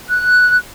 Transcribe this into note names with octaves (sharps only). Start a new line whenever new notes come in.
F#6